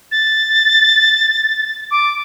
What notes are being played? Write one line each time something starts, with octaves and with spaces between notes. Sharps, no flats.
A6
D6